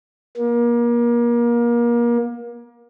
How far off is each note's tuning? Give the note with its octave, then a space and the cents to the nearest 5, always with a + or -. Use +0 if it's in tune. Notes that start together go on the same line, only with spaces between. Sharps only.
A#3 +30